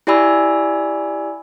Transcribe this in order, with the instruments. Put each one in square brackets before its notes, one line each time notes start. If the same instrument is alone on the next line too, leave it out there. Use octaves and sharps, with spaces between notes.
[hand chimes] E4 G4 D5 G#5 B5 E6